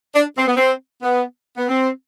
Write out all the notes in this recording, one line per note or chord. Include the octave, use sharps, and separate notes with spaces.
D4
C4
B3
C4
B3
B3
C4